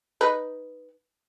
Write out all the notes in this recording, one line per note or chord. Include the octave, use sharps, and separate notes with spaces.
D#4 B4